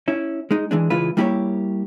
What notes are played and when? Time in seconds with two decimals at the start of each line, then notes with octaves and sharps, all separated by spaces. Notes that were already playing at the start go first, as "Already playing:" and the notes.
0.08 C#4 E4
0.51 G#3 D#4
0.71 E3 G#3 D4
0.90 C#3 E3 G#3 E4 F4 B4
1.17 G3 A#3 E4 G4 B4 C#5